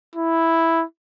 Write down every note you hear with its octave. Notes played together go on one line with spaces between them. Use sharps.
E4